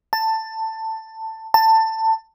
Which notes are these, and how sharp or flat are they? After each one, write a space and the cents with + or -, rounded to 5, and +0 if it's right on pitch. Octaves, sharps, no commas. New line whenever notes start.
A5 +15
A5 +20